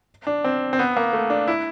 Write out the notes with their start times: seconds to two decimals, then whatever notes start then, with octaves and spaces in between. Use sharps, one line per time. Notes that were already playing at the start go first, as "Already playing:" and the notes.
0.27 D4
0.44 C4
0.73 C4
0.79 B3
0.97 A#3
1.13 A3
1.30 D4
1.47 E4